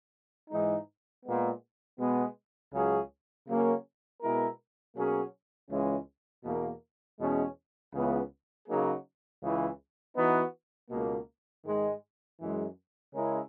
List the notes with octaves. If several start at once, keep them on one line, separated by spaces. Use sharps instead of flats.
G#2 E3 G#3 D#4
A#2 G#3 B3
B2 G#3 B3
C#2 C#3 F#3 C#4 G#4
C#3 F#3 A#3 C#4
B2 G#3 B3 E4 A#4
B2 F#3 A#3 C#4 G#4
C#2 C#3 E3 G#3 C#4
E2 B2 A#3
E2 B2 G#3 C#4 G#4
C#2 C#3 E3 B3
C#3 F#3 A#3 D#4 G#4
C#2 C#3 E3
E3 B3 D#4 F#4 B4
C#2 B2 A#3
G#2 D#3 G#3
F#2 E3 G#3
C#3 G#3 C#4 E4 A#4